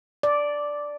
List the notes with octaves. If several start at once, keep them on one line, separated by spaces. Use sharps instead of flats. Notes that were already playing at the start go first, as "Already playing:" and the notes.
D5